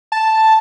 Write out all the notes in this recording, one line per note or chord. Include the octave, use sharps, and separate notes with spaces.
A5